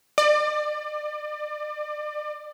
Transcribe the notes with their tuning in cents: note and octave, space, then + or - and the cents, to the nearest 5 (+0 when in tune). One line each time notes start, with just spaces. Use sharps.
D5 +35